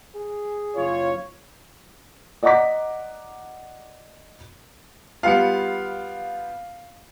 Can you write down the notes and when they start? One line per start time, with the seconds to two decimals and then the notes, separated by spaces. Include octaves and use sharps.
0.15 G#4
0.76 F#1 F4 C#5
2.43 D5 D#5 F#5 A#5 D6 B6
5.23 G3 B3 F4 F5 C#7